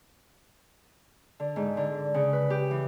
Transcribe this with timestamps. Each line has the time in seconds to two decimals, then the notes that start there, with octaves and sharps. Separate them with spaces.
1.40 D3
1.56 G#2
1.77 D3
2.14 C#3
2.33 B4
2.50 G4
2.71 E3